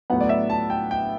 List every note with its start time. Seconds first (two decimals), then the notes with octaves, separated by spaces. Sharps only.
0.10 A2 F#3 B3 F#5
0.21 D5
0.29 E5
0.50 A5
0.70 G5
0.91 G5